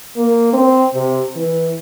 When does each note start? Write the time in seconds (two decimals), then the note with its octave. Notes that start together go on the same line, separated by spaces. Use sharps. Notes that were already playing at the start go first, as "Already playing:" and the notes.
0.17 A#3
0.53 C4
0.95 C3
1.36 E3